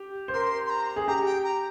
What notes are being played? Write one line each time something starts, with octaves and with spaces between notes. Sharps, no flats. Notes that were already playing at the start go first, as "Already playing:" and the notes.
Already playing: G4
C5
A#4 C6
C6
A#5
G#4
G4 A#5
G5
A#5